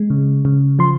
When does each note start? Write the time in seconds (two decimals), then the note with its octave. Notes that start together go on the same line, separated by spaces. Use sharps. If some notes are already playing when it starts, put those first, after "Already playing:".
Already playing: G#3
0.10 C#3
0.45 C#3
0.79 F3 C6